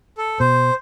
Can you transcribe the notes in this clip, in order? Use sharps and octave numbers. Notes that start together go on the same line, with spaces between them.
A4
B2 C5